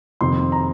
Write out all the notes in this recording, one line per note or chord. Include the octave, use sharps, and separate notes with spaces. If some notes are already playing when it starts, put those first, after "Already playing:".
F2 C3 D#3 C6
A#5